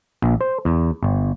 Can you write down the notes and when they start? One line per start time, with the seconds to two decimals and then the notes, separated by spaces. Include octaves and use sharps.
0.22 A#1
0.41 C5
0.65 E2
1.03 G1